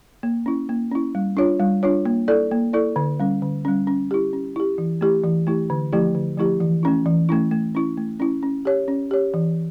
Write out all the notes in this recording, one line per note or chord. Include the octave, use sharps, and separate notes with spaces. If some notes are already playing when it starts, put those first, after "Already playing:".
A#3
C#4 E4
A#3
C#4 E4
G3
D4 F4 C#5
G3
D4 F4 C#5
A#3
E4 A4 D5
A#3
E4 A4 D5
D3
G3 C#4
D3
G3 C#4
C#4
E4 G4
C#4
E4 G4
E3
A3 E4 G4
E3
A3 E4 G4
D3
F3 A3 E4 G4
D3
F3 A3 E4 G4
E3
A3 C#4 E4
E3
A3 C#4 E4
A3
C#4 E4
A3
C#4 E4
C#4
G4 C#5
C#4
G4 C#5
E3